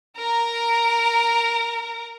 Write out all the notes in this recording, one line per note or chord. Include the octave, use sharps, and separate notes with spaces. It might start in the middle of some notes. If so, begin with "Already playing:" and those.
A#4 A#5